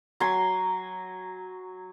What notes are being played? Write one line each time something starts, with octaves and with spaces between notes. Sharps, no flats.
F#3 G#5 C6